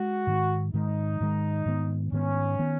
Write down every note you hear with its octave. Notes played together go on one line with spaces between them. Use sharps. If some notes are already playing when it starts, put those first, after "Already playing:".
Already playing: G#3 F#4
G#2 D#3 G#3
G#2 D#3 G#3 D#4
G#2 D#3 G#3
G#2 D#3 B3
G#2 D#3 B3 C#4
D#3 B3